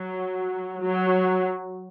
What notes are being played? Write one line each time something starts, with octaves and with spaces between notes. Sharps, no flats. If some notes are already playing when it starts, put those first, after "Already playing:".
Already playing: F#3
F#3